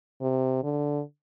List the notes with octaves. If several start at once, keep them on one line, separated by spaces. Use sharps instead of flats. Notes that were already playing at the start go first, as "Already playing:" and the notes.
C3
D3